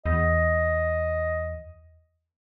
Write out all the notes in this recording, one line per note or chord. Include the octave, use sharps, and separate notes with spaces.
E2 D#5